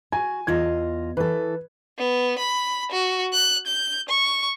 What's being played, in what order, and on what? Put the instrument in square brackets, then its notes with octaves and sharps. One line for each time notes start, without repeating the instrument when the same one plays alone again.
[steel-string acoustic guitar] F#4 [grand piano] G#5
[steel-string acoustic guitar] E2 F4 D#5 [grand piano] G#6
[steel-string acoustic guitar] E3 A4 [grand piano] B4
[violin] B3
B5
F#4
F#6
G6
C#6